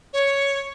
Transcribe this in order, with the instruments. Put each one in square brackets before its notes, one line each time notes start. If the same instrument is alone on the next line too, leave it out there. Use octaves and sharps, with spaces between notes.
[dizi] C#5